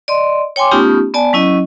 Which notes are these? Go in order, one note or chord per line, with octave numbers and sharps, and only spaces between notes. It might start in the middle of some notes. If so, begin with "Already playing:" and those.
D5 D#5 C6
C#5 G5 G#5 C6 D6
A3 B3 C#4 D#4 F4 G4
B3 D5 G#5 A5
F#3 C#4 E4 D#5